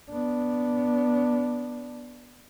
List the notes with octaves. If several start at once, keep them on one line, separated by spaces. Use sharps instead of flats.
B3 D4